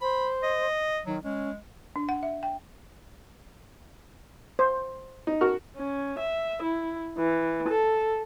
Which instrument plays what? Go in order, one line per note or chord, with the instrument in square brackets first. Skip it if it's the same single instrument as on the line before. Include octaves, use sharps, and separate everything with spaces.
[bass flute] C5 [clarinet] B5
[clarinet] D#5
[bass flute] D#3 [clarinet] F#3
[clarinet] G#3 [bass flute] C#4
[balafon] D4
F#5
E5
G5
[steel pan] C5
[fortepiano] D#4
F#4 A#4 F6
[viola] C#4
E5
E4
E3
A4